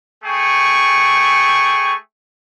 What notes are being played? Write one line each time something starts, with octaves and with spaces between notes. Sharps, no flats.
A3 G#4 G5 C#6